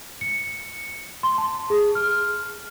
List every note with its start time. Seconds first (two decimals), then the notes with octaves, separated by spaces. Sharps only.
0.21 C#7
1.23 C6
1.38 A5
1.70 G#4
1.95 F6